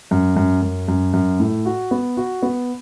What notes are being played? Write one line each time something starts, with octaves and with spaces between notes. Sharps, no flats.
F#2
F#2
F#2
F#2
F#2
A2
F#4
B3
F#4
B3